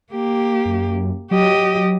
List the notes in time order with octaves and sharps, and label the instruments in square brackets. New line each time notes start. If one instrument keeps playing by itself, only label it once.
[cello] A#3 G4
[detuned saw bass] F#2
[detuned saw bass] F#3 [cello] G4 D#5